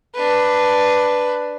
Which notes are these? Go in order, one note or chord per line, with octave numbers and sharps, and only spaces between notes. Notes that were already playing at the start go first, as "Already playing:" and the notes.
D4 B4